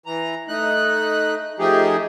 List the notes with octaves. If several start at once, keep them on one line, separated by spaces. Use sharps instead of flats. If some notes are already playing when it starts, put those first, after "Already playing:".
E3 A#5
A3 D#4 F#6
F3 A3 D#4 G4 G#4